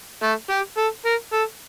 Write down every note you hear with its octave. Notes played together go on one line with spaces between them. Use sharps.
A3
G4
A4
A#4
A4